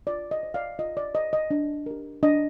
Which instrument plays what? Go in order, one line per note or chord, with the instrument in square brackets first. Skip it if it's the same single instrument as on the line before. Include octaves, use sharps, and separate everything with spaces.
[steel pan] F4 D5
D#5
C5
D5 F5
F4 D#5
D5
C5 D#5
D#5
D4
G4 A#4
D4 D#5